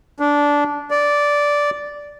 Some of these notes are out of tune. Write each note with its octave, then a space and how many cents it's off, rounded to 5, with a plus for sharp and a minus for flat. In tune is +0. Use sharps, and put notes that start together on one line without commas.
D4 -15
D5 -10